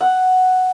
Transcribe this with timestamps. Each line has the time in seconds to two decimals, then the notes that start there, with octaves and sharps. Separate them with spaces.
0.01 F#5